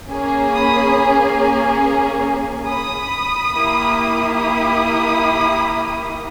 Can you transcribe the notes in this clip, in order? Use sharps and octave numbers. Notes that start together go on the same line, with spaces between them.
A#3 C#4 G#4
B5 D#6
B5 D#6
A#3 E4 G4
B5 D#6